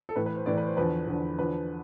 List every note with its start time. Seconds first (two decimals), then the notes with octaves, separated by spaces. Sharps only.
0.09 A4
0.16 A2 E3 B4
0.26 B4
0.36 C5
0.46 A2 E3 D5
0.57 B4
0.67 C5
0.77 E2 D3 F3 B4
1.07 E2 D3 F3
1.38 E2 D3 F3 B4